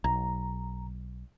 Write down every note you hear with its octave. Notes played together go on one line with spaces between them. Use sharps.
B1 A#5